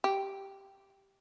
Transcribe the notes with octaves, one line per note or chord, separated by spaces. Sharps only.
G4